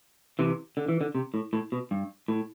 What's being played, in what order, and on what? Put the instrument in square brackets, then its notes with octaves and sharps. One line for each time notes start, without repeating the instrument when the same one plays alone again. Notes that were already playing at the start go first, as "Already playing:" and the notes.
[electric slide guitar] C3 E3
D3
E3
D3
C3
A2
A2
B2
G2
A2